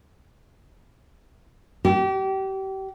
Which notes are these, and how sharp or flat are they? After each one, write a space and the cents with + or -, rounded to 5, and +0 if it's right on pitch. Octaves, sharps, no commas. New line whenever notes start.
G4 -30